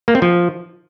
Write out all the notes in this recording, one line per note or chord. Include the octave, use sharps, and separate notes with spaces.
A#3
C4
F3